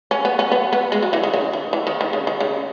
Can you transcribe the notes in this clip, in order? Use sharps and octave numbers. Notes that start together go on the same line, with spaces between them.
C#4
B3
C#4
B3
B3
G#3
F#3
E3
D#3
C#3
D#3
E3
D#3
D#3
C#3
D#3
C#3